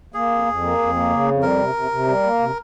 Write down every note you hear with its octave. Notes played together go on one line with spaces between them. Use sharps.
A#3 G#4
F2
F2
A#3
F2
A#3
C#3
F2
G3 A#4
C3
C3
C3
G3
A#3
C3